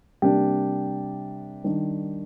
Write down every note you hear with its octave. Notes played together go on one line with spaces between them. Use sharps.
C3 G3 A#3 D4 G4
D#3 G3 D4